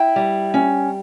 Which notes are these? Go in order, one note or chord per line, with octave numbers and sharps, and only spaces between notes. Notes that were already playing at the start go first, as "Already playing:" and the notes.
Already playing: E4 G5
G3
C#4